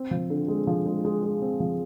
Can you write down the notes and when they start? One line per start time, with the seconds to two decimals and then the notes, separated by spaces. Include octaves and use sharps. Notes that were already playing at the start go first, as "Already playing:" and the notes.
Already playing: C4
0.11 F3
0.30 D3
0.48 G#3
0.67 F3
0.86 G#3
1.05 G#3
1.23 G#3
1.42 C4
1.60 F3